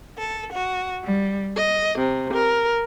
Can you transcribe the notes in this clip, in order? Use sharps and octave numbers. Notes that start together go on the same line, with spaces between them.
A4
F#4
G3
D#5
C3
A#4